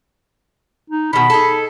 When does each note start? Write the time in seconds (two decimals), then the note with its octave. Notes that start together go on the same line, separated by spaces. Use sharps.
0.90 D#4
1.13 B2 D#3 B5
1.30 D#4 G#4 A4